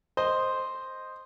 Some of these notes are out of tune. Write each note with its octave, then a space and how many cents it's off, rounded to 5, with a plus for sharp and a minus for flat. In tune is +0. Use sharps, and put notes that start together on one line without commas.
C5 +0 D#5 -5